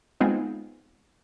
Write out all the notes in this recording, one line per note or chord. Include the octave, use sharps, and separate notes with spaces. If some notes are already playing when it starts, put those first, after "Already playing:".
G#3 B3 C4 D#4 F4 G#4